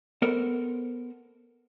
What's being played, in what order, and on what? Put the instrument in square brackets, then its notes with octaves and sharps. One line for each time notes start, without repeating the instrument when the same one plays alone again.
[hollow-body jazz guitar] B3 A4 A#4 C5